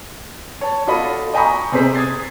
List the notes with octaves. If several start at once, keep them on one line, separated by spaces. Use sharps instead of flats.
C#5 A5
F4 F#4 A4 D#5 B5
D#5 G5 G#5 A#5 B5 C#6
C3 C4 G#4 C5 B6
D#6 G#6 A6 C7